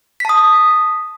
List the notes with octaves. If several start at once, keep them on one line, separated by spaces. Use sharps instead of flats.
A5 D#6 B6